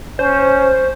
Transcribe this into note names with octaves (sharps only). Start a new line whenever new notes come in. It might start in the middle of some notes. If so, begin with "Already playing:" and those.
C#4 C5